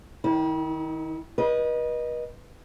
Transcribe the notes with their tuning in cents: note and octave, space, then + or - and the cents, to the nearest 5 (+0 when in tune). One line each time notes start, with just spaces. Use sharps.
D#3 +0 E4 -40 D#5 +0
B4 -40 D#5 -10